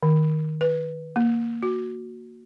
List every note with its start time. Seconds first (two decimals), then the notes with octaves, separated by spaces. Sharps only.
0.03 D#3
0.61 B4
1.16 A#3
1.63 F#4